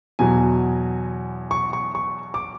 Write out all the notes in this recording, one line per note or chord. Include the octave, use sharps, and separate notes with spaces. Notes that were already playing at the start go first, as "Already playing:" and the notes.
E2 B2 F#3 G#5
C#6
C#6
C#6
D6